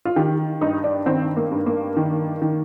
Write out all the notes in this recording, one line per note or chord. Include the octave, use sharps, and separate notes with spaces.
F4
D#3 G4
G2 D#4
D4
D#3 C4
A#3
G2
A#3
D#3
D#3